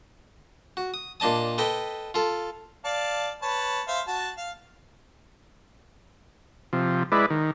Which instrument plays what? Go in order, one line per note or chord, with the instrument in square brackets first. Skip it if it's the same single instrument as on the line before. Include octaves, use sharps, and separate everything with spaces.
[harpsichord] F#4
D#6
A#2 D4 D#5 A5 D#6
A4 B4 D#5 G5
F4 A4
[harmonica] D5 F5 A5
B4 C#5 A5
C5 E5 F5
F#4 A5
F5
[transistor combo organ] C3 F3
G#3 E4 B4 D5
D#3